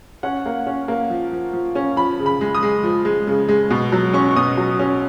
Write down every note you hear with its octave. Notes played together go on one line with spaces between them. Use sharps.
C#4 F#5
A#3
C#4
A#3
F3
F3
F3
C#4
F3 B5
C#3
B5
G#3
D#6
G#3
F3
G#3
C#3
G#3
B2
F#3
C#4 C#6
C#6
B2 D#6
F#3
C#4